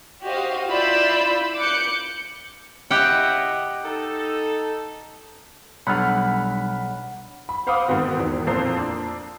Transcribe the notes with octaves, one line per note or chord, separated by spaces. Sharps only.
F#4 G4 C5 D#5 F5
E4 F4 D5 B5 E6 G6
D6 F#6 G6 C#7
C#3 E4 G4 D#5 F#5 G5
D#4 A4
B1 G3 D4 F#5 B5 F6
B5
C5 F5 F#5 B5 D6 D#6
G#2 D#3 B3 C4 F#4
E2 D#3 E3
F2 A#2 C5 A#5 E6 C7
D4